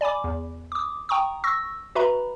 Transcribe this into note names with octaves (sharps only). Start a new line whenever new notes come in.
D5 G#5 B5 D6
E2
D6 D#6
G5 A#5 C#6 D#6
C#6 E6 A#6
F#4 B4 E5 A#5 B5